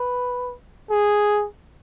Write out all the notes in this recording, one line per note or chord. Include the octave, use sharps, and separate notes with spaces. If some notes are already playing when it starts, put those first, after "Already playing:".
Already playing: B4
G#4